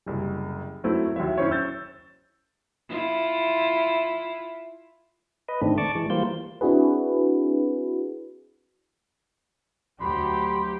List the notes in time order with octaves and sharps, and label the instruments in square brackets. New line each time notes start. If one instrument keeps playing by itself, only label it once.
[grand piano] F#1 C2
F#3 A3 C4 E4
D#2 F#3 E5
C#4 E4 C5 C#5
E6 G6 A6
[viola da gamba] E4 F4
[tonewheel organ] B4 D#5
G#2 D#3 A3 C4 D4
D5 A5 C#6 D6
E3 G#3
E3 G3 A#3 F4 C5 G6
[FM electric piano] C4 D4 E4 F#4 G#4 B4
[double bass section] D2 F#3 [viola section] G4 [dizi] B5 [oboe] C6